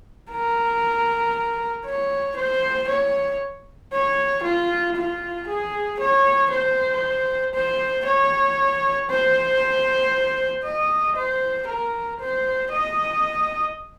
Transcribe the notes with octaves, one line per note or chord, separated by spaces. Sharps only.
A#4
C#5
C5
C#5
C#5
F4
F4
G#4
C#5
C5
C5
C#5
C5
D#5
C5
A#4
C5
D#5